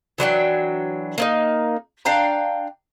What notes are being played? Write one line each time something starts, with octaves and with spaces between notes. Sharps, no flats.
E3 F#3 D4 G5
A#3 C4 D#4
D4 F5 G5 A#5